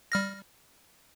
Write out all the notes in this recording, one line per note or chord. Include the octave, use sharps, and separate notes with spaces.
G3 F6 A#6